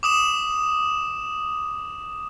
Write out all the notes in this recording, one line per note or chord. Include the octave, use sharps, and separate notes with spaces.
D6 D#6 E7